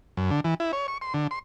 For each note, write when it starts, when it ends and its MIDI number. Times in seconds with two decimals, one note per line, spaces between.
0.17 0.30 42
0.31 0.40 50
0.44 0.54 52
0.60 0.72 64
0.73 0.87 73
0.88 0.98 85
1.01 1.13 84
1.14 1.27 50
1.31 1.39 84